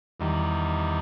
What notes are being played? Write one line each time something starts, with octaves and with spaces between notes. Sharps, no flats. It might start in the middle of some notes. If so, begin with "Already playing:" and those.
E2 D#3 G3